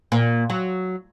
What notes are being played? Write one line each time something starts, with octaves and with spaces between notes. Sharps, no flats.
A#2
F#3